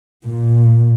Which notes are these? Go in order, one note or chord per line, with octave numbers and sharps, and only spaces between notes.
A#2